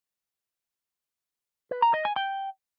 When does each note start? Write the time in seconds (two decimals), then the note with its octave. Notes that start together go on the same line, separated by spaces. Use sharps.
1.71 B4
1.82 A#5
1.94 D#5
2.05 G#5
2.16 G5